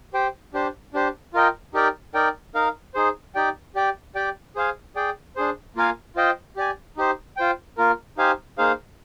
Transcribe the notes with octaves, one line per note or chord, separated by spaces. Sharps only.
G4 C5 G5
D4 G4 C5
D4 G4 C5
F4 A#4 D#5 G5
D#4 G4 A#4 D5 G5
D#4 A#4 D5 G5
D#4 A#4 F5
D#4 G#4 C5
D#4 G4 D5 G5
G4 D5 G5
G4 D5 G5
G#4 C5 F5 G#5
G#4 D5 G5
D4 G#4 C5
A#3 F4 A#4 F5 G#5
F4 C5 D#5 G5
G4 D5 G#5
D#4 G4 C5
F4 C5 G5
A#3 F4 A#4
D#4 G4 C5 F5 G#5
A#3 D#4 G#4 C5 F5